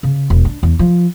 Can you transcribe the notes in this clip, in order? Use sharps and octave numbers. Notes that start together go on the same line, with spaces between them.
C#3
E1
D4
E2
F3